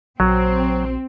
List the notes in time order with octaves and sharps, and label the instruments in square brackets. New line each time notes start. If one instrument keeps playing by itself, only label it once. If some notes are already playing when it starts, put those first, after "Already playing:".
[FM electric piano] A#1 F#4 [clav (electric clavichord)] F#3 [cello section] C4